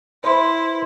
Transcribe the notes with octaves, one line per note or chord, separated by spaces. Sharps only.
E4 B4 C5 C6